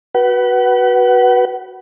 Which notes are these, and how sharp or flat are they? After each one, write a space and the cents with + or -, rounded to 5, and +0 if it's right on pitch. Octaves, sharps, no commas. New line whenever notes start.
F#4 +0 B4 -15 F#5 +35